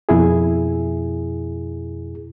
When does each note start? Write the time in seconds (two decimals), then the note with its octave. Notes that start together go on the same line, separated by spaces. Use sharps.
0.09 F2 B2 E4 G#4